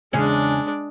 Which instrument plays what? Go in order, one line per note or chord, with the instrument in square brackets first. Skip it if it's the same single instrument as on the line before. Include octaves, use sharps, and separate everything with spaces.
[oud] E2 C#3 C#4 [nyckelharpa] G#3 D4